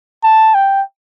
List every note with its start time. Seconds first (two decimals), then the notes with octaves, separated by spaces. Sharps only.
0.24 A5
0.54 G5